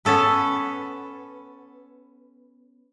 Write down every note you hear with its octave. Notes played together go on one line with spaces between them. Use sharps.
B3 C#4 A4 B4